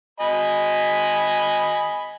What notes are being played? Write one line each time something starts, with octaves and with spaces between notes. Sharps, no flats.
D#5 G#5 B5